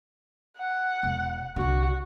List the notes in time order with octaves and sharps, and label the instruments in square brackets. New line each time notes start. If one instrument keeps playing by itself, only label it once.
[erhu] F#5
[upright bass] E1
[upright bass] C2 D3 [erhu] F#4